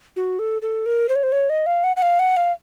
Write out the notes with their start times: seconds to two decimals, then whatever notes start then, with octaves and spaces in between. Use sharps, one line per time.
0.16 F#4
0.39 A4
0.62 A4
0.86 A#4
1.09 C5
1.15 C#5
1.23 C5
1.32 C#5
1.50 D#5
1.66 F5
1.84 F#5
1.96 F#5
2.02 F5
2.19 F#5
2.37 F5